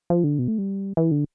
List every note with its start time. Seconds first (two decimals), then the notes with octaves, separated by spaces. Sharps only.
0.10 F3
0.24 D3
0.39 B2
0.48 A3
0.58 G3
0.97 E3
1.11 D3